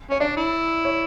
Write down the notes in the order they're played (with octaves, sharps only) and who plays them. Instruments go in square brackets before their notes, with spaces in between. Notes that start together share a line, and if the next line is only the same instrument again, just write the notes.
[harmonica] C#4 [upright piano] C#5
[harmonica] D4 [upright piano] D5
[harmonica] E4
[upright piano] C#5